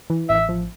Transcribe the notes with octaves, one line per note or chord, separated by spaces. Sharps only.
E3
A1 E5
F3